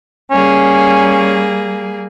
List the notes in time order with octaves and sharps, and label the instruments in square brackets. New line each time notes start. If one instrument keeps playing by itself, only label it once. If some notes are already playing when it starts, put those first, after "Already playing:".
[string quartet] G3 A#3 G#4 [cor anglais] C#4